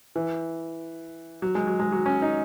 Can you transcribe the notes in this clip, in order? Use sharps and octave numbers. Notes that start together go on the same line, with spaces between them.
E3
F#3
G#3
F#3
G#3
F#3
C#4
D#4